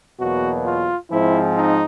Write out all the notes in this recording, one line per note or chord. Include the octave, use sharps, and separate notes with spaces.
E2 B2 F#3 A#3 F#4
F4
G#2 F3 G#3 C4 E4
D#4